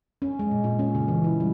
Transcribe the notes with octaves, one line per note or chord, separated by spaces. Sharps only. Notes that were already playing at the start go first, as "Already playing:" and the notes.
C#4
G#3
A#2
A#2
C#4
C#3
E3
E4
G3